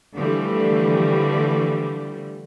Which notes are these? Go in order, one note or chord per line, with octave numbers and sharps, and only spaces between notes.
D3 E3 F3 G3 A3